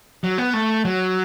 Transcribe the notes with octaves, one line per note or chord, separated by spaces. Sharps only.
F#3
B3
A3
F#3